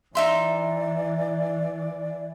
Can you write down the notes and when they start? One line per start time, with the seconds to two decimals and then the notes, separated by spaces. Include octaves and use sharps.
0.15 E3 D#4 D5 E5 C6